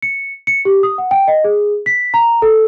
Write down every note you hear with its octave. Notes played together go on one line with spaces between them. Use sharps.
C#7
C#7
G4
D#6
F#5
G5
D#5
G#4
B6
A#5
A4